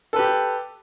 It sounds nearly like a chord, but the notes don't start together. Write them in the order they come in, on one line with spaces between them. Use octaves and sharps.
A4 B4 G4